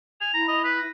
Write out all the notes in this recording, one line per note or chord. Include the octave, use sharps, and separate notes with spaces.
G#5 F7
E4 A#5
D#5
B4 B6
A#6